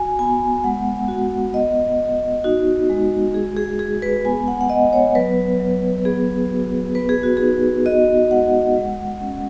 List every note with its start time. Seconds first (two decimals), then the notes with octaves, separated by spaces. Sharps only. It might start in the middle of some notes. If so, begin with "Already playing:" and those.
Already playing: F#4 G#5
0.19 B3 G#5
0.64 G#3 F#5
1.08 F#4
1.53 B3 D#5
1.99 B3
2.44 D#4 F#4
2.89 G#3
3.34 F#4 G#4
3.57 G#4
3.79 G#3 G#4
4.02 B4
4.25 B3 G#5
4.48 F#5
4.61 F#5
4.69 B3 D#5
4.93 C#5
5.15 F#3 B4
5.60 F#3
5.97 B4
6.05 B3 G#4
6.50 F#4
6.95 B3 B4
7.09 G#4
7.23 F#4
7.37 D#4 G#4
7.86 F#4 D#5
8.31 G#3 F#5
8.76 G#3
9.21 C#4